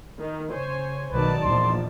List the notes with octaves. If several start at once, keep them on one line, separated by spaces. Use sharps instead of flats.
D#3
C#3 C5 C#5 G#5
B1 D#3 F#3 D#4 B4 D5 A5
A#1 E2 F3 C6